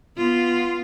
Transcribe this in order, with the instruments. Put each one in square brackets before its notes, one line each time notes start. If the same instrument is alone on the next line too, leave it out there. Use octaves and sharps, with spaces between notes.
[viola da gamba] B3 F4